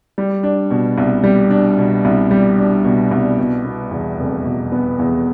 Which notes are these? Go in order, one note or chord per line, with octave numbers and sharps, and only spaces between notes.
G3
D4
B2
C2
G3
D4
B2
C2
G3
D4
B2
C2
B2
B3
E2
F1
B2
B3
E2